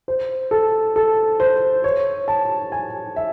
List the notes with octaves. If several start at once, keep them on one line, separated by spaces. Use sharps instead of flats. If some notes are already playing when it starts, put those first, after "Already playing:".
C5
A4
A4
C5
C#5
A5
G#5
E5